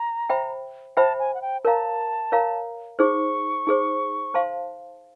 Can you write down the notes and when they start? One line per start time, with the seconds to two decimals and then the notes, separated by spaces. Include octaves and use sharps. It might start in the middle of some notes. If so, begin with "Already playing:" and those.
Already playing: A#5
0.30 C5 E5 G5 B5
0.97 C5 E5 G5 A5 B5
1.19 G#5
1.34 F#5
1.42 G5
1.65 A#4 C#5 F5 A5 A#5
2.32 A#4 C#5 F5 A#5
2.99 D#4 G#4 C5 C#6
3.67 D#4 G#4 C5
4.34 C5 F5 A5 C6